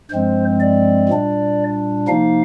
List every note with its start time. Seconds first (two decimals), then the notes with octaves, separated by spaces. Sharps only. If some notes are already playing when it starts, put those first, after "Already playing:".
0.10 G2 F3 G#3 C4 C5
0.60 D5
1.09 A#2 G3 D4
2.07 C3 F3 A#3 D#4 F5